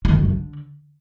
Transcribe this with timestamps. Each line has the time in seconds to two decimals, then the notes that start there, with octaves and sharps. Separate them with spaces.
0.05 D#3
0.15 F#2
0.25 D3